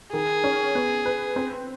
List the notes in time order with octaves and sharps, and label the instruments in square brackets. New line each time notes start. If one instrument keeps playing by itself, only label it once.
[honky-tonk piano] D#3 [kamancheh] G#4
[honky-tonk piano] C#4
B3
B4
C4